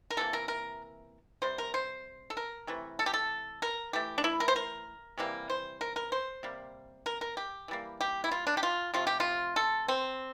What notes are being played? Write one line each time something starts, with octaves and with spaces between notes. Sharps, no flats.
A#4
C3 E3 A#3 A4
A#4
A#4
C3 G3 C5
A#4
C5
A4
A#4
C3 E3 A3
A4
G4
A4
A#4
E3 A3 G4
D4
E4
A#4
C5
A#4
C3 E3 G3 A#3
C5
A#4
A#4
C5
C3 G3 A#3
A#4
A#4
G4
E3 G3 A#3
G4
E4
F4
D4
G4
F4
C3 F3 A3 F4
G4
F4
A4
C4